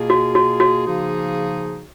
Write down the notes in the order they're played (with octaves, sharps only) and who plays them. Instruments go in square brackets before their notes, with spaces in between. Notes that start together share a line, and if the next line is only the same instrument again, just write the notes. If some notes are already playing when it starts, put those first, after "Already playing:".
Already playing: [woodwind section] B2 A#3 F4 G#4
[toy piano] F#4
F#4
F#4
[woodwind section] C#3 F3 A#3 D#4 G#4